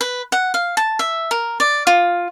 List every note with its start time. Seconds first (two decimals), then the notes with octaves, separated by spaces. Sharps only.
0.01 B4
0.32 F#5
0.54 F5
0.77 A5
0.99 E5
1.31 A#4
1.60 D5
1.87 F4